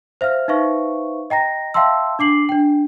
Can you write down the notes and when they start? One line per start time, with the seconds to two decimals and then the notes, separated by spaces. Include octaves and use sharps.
0.21 C5 E5 F5 F6
0.48 D#4 B4 C5 E5 F5 C#6
1.30 D#5 G5 A#5 A#6
1.74 E5 F5 G5 A5 C6 E6
2.19 D4 D6 C7 F#7
2.49 D4 G5